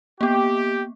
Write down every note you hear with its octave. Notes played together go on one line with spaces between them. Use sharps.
A#3 B3 G4